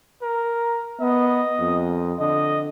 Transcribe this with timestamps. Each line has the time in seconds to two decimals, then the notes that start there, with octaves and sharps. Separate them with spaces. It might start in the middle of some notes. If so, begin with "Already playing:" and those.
0.22 A#4
1.01 B3 D#5
1.60 F2
2.20 D3 D#5